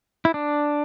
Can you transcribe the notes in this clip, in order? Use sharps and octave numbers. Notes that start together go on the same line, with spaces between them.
E4
D4